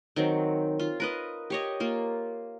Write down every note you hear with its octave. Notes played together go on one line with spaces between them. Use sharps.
D#3 F#3 C4
F4
A#4 B4 D#5
G4 C#5 D#5
A#3 F4